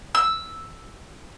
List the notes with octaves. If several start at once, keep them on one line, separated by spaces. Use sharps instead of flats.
E6